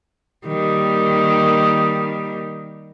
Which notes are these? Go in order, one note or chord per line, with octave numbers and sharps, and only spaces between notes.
D#3 G3 A#3